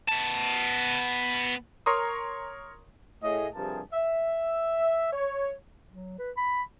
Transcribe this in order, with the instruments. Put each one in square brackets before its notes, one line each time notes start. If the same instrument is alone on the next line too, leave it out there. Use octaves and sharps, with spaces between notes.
[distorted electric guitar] B3 A5
[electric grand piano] A#4 C#5 A#5 C6 C#6 D#6
[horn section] A2 G#4 D#5
G2 C3 F3 G#4 A#4 A5
E5
C#5
[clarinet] F#3
B4
B5